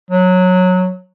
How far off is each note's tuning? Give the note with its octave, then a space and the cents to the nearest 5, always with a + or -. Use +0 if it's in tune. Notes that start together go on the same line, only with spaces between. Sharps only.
F#3 -15